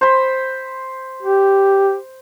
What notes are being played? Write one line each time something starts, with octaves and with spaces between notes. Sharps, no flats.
C5 B5
G4